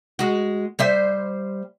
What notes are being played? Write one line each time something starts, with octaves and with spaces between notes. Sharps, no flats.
G#3 F#4
G3 C5 E5